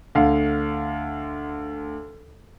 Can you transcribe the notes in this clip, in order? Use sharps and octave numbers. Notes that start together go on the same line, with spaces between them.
D2 D3 F5